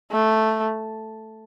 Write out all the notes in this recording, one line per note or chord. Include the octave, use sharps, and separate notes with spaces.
A3